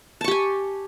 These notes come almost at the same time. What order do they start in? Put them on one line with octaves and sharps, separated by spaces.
A5 C#6 G4 G#5